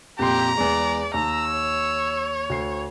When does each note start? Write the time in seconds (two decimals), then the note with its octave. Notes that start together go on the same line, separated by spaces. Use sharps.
0.19 F2 A#2 G4 A#5 C6
0.58 E2 G#3 D5
1.14 D#2 A#5 E6
1.51 C#5
2.50 D2 C7